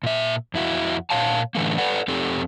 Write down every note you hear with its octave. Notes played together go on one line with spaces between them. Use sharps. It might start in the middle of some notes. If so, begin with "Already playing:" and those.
A#2 E5
F2 E4 F#4
A#2 C#5 F5 A5
A2 D3 E3 A3 A#3
A4 B4 D5 F#5
F2 C4 G4 A4